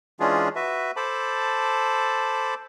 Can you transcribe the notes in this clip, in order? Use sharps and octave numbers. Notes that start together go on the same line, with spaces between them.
E3 G#3 C#4 D4 F4 G#4
F#4 B4 E5
A4 C5 A5 B5 D6